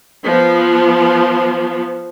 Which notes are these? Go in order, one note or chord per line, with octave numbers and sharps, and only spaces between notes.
F3 B3